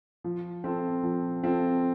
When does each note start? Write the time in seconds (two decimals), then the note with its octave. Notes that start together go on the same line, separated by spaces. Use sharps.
0.24 F3
0.64 C4 F4 A4
1.03 F3
1.43 C4 F4 A4